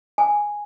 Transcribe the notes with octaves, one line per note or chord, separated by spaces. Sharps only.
G#5